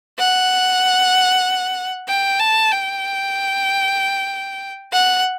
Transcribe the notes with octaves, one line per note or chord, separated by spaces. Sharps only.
F#5
G5
A5
G5
F#5